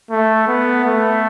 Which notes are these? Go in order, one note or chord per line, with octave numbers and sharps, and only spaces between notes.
A3
B3
A3